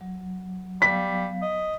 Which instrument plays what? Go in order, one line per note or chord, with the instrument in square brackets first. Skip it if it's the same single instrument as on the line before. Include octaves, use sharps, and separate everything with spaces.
[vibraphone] F#3
[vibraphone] F#3 B3 F5 [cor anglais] G3 [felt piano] B6
[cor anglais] D#5